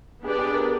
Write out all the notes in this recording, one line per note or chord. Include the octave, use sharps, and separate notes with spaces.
B3 D4 G4 G#4 B4 D5
G#4
A#4